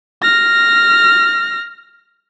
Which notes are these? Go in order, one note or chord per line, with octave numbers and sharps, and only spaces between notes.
F6 A#6